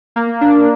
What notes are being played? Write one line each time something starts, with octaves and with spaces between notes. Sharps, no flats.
A#3
D4